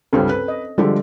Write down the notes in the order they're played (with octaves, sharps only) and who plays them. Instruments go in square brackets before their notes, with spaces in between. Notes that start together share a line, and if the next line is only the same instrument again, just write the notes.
[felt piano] C#2 G2 C#3 [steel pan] C4 C#4 A4
[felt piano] B4
[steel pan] D#5
[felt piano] D3 F3 G4 [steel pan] G3 G#3 A4